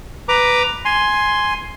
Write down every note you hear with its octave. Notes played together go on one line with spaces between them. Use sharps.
B4 A#5 D6
G#5 C6